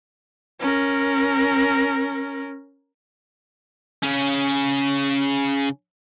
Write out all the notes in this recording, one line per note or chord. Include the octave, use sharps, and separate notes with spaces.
C#4 A#4
C#3 C#4